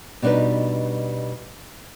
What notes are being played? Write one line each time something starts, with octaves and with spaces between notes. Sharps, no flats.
B2 G3 D4 D#4 B4